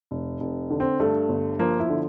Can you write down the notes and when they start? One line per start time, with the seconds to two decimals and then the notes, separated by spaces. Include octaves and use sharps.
0.11 F1
0.40 F1
0.70 D3
0.80 C4
1.00 G2 A3
1.29 G1
1.59 F3 A#3
1.80 E4
1.90 D3